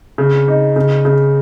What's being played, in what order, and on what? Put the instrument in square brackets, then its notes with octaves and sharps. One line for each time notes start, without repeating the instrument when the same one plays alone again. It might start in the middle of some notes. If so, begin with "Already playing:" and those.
[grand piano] C#3
D#4
C#3
C#3